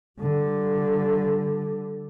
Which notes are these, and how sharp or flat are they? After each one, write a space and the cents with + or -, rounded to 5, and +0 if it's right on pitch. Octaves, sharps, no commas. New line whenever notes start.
D3 +0 G3 -30